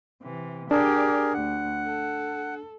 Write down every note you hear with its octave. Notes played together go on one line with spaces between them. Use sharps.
C3 E3
D4 G4 G#4 A#4 D5
D2 F#5
A4